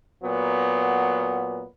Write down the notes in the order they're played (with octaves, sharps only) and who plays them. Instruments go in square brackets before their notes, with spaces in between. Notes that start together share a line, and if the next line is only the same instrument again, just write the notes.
[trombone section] A#2 F#3 B3